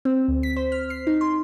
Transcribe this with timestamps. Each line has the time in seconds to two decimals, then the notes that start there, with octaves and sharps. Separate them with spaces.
0.05 C4
0.28 D2
0.43 B6
0.56 C5
0.72 F6
0.90 C7
1.07 D#4
1.21 C6